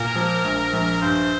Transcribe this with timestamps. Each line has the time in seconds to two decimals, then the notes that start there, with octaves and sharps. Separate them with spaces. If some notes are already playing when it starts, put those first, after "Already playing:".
Already playing: A#2 A#4
0.15 F3
0.44 A#1
0.73 A#1
1.02 G2 C5